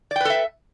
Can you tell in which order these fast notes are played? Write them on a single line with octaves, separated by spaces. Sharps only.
D5 G5 B4 A4 E5